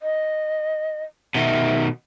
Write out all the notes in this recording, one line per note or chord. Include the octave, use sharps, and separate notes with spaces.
D#5
B2 D#3 E5